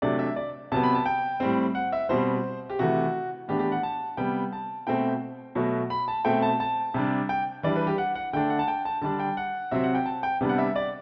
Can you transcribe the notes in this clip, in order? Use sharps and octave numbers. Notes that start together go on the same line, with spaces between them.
C3 F#3 A3 D4 D5
E5
D5
C3 F#3 B3 A5
B5
A5
G5
A2 G3 C4
F#5
E5
B2 G3 C4 C5
G4
C3 E3 A3 F#4
A2 E3 B3 D4 G4
G4
F#5
A5
C3 G3 B3 G5
A5
B2 A3 C4 G5
B2 F#3 A3
B5
A5
B2 A3 C4 G5
A5
A5
C3 G3 D4
G5
E3 G3 D4 D5
B4
G4
F#5
F#5
D3 A3 D4 G5
F#5
A5
G5
A5
D3 G3 D4 A5
G5
F#5
C3 F#3 C4 E5
F#5
G5
A5
G5
C3 G3 B3 D4
F#5
E5
D5